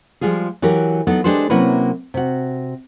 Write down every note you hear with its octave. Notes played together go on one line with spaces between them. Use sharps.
F3 G3 G#3 F4 G#4
E3 F#3 G4 A#4
F#3 B3 D#4 A4
G#3 D4 G4 A4 B4 C5
C3 F#3 A#3 C#4 E4 B4
C3 F#4